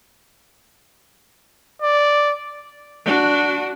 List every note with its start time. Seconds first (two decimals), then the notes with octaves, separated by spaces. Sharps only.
1.82 D5
3.05 D4 F#4